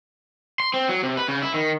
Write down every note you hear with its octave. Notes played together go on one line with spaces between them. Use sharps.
C6
C4
F#3
C3
B4
C#3
E4
D#3